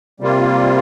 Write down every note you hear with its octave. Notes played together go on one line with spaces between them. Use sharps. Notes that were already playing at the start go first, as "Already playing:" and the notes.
C3 G3 A#3 F4